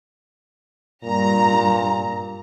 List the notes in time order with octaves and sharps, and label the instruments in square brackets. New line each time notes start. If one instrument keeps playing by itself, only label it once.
[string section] G2 A#5 [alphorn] A#2